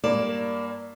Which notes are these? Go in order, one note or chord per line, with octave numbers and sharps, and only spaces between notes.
G2 A#3 D5 E7